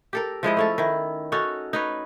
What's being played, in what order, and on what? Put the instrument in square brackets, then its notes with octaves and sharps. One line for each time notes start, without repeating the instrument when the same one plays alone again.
[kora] G4 A4 A#4
F3 G#3 E4 D#5
A3 C#4 A4
D#3 E4
C#4 D#4 F#4 A4
D#4 B4 C#5